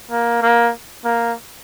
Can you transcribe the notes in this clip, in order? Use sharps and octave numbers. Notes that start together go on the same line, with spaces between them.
A#3
A#3
A#3